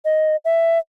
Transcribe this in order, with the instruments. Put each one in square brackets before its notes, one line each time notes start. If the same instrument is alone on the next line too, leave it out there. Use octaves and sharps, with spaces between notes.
[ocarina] D#5
E5